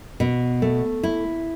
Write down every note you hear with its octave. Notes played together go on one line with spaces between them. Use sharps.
B2
A3
E4